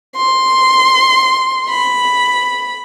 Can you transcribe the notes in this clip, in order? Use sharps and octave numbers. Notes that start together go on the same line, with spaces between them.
C6
B5